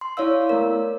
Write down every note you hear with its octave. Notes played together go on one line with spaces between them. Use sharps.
C6
E4 C#5 D5 F5 E6
A3 B3 A#4